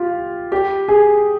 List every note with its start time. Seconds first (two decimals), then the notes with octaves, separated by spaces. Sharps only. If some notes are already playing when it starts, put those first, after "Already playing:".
Already playing: F4 G4
0.52 G4
0.88 G#4